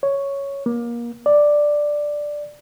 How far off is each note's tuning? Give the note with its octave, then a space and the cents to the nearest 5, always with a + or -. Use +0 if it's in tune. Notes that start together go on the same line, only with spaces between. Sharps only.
C#5 +5
A#3 +25
D5 +5